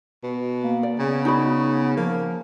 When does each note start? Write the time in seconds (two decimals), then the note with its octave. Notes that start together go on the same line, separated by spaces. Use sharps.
0.23 B2
0.64 A#3
0.83 D5
0.99 C#3 B3
1.25 D#4 F#4 B5
1.97 F3 A#3